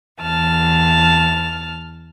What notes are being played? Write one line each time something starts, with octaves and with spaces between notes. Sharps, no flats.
E2 A5 F6